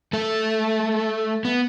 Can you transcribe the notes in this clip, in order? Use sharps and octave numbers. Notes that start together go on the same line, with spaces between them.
A3 A4
B3